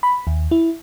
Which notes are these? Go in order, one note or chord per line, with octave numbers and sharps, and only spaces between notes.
B5
D#2
E4